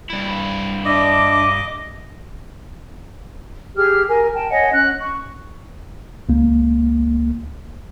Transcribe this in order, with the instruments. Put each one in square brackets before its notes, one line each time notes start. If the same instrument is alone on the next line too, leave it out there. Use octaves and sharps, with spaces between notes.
[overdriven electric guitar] G2 E4
[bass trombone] D4 [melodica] D#5 [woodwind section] E5 D6
[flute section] G4 G#4 F6
A#4 G#5
G5 A5
C#5 D#5 F#5 G#5
C#4 F#6
C#6
[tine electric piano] C#2 A#3